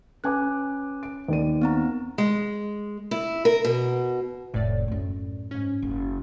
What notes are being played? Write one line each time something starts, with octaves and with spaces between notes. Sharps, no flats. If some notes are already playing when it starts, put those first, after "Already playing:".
C#4 B4 G#5 D6 F#6
D7
D#2 D5 D#7
B3 C4 A#5
G#3
E4
A#4
B2
F1 A2 D5 A6
F#2 A3
G#2 C#4
F#1